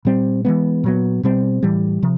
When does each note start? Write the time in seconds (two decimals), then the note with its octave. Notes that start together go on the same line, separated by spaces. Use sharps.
0.05 A#2 G3 C4
0.45 E3 G#3 B3
0.84 A#2 F#3 B3
1.23 B2 G3 C4
1.63 A2 E3 G3
2.03 C3 F3